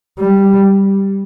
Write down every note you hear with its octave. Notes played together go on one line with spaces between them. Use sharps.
G3